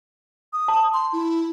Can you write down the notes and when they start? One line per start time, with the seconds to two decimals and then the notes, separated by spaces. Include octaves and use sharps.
0.53 D#6
0.68 A5
0.93 C6
1.13 E4